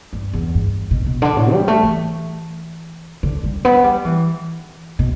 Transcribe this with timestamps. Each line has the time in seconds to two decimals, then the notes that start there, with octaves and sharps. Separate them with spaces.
0.13 G2
0.34 E2
0.55 G2
0.91 B2
1.06 B2
1.22 D3
1.37 A2
1.53 G3
1.68 A3
1.83 E3
3.23 D3
3.44 G3
3.65 B3
3.84 G3
4.05 E3
4.99 B2